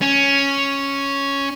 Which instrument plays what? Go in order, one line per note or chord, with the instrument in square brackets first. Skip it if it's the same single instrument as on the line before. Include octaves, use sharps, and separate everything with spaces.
[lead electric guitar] C#4